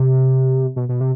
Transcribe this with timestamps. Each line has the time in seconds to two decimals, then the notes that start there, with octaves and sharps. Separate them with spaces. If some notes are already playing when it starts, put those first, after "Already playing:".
Already playing: C3
0.76 B2
0.89 B2
1.01 C3